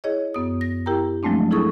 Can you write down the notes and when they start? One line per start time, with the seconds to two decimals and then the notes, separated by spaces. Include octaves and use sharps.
0.04 E4 G#4 C#5 D#5
0.34 F#2 B3 D#6
0.61 A#6
0.86 E4 G4 A#4 G5 A#5
1.23 F3 F#3 G#3 A3 C4 D4
1.51 D#4 E4 G#4 A4 C#6 D#6